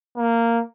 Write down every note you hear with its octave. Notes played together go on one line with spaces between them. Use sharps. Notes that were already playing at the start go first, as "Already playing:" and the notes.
A#3